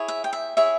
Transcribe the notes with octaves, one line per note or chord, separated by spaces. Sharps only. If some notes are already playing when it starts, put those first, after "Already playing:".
Already playing: E4 G#4 C#5
E5
G5
E5
E4 G#4 C#5 E5